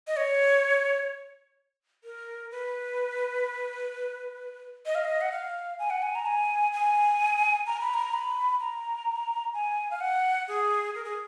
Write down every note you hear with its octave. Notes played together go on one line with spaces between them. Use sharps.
D#5
C#5
A#4
B4
D#5
F5
D#5
F#5
F5
G#5
F#5
G#5
A#5
G#5
G#5
A#5
B5
A#5
B5
A#5
G#5
F5
F#5
G#4
A#4
G#4